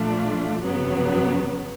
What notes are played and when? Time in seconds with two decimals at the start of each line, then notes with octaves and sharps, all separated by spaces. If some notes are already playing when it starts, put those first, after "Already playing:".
Already playing: A#2 F3 A3 D4 F4
0.63 G1 F2 C#3 F#3 B3